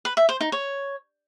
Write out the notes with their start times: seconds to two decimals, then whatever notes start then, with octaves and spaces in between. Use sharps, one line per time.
0.05 B4
0.17 E5
0.29 C5
0.41 D#4
0.52 C#5